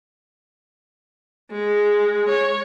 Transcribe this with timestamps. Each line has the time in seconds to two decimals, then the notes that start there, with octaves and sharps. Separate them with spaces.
1.52 G#3
2.30 C#5